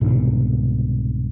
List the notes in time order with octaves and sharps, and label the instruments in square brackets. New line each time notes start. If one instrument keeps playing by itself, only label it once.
[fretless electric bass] C2 G#2 B2 D3